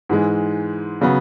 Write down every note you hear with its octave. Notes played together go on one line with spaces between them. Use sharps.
G#2 E3 G#3
C#3 F#3 B3